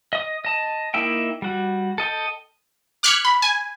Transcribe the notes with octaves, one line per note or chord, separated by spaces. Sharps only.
D#5 D#6
D#5 A5
A#3 D#4 E4 E5 G5
G3 F#4
A4 D#5 G5
D6 F6 F#6 G#6 B6 C#7
B5
G#5